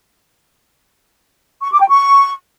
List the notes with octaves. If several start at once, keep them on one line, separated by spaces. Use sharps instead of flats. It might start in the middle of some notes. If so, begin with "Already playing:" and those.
C#6
D6
G5
C#6